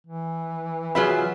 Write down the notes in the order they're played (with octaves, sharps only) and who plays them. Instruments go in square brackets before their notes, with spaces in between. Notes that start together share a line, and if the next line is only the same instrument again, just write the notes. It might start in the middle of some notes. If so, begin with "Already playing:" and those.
[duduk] E3
[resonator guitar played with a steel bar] F#3 F4 E5 [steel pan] G#4 B4 B5